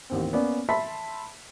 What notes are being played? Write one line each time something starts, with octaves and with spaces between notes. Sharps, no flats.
A1 D#2 C4
A#3 B3 C#4 D5
E5 A5 B5 C6 B6